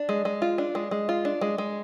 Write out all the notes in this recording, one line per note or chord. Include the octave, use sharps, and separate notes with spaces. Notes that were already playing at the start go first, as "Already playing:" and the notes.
Already playing: D4
G#3
G#3
F4
D4
G#3
G#3
F4
D4
G#3
G#3